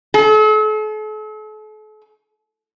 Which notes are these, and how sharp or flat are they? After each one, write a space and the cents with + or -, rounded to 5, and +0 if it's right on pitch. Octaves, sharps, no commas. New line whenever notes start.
A4 -45